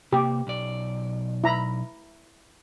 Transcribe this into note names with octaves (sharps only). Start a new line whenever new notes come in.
C3 A#3 G4
B1 D5
E4 A#5 B5